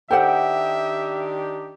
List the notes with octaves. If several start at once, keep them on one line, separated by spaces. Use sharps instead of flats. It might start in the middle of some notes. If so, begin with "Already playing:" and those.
D#3 D4 G4 A4 C5 E5 F#5 G5